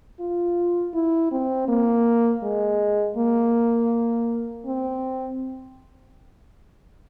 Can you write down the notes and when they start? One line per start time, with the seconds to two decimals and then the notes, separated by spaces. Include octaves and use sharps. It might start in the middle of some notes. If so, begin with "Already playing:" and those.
0.20 F4
0.94 E4
1.32 C4
1.68 A#3
2.43 G#3
3.17 A#3
4.66 C4